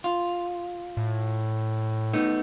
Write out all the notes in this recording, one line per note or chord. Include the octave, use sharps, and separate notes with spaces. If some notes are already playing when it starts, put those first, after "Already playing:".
F4
A2
A3 B3 D#4